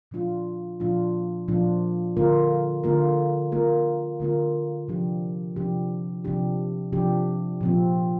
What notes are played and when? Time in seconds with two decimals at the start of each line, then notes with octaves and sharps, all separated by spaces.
0.11 A#2 F3 D4 F4
0.80 A#2 F3 D4 F4
1.48 A#2 F3 D4 F4
2.17 D3 A#3 F4 A#4
2.84 D3 A#3 F4 A#4
3.52 D3 A#3 F4 A#4
4.20 D3 A#3 F4 A#4
4.88 C3 F3 D4 G4
5.56 C3 F3 D4 G4
6.25 C3 F3 D4 G4
6.92 C3 F3 D4 G4
7.61 A#2 F3 C4